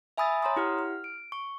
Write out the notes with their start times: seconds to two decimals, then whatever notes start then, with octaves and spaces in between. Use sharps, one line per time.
0.17 E5 G#5 B5 D#6 E6 A6
0.42 C#5 A#5 C6 D#6
0.56 E4 G4 F#5 F6
0.79 F6
1.04 D7
1.32 C#6